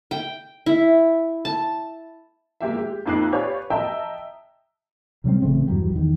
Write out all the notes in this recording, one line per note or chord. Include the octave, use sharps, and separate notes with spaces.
G5
E4
A5
G#3 A#3 G4 E5
G#3 G4
F2 A#3 D#4 D6 F#6 C7
G4 B4 C#5 D5 F5
D#5 E5 G5 A5 A#5 E6
C3 F#3 G3 C4
A1 C#3 A3 C4
E2 G2 F#3 G3
E2 D#3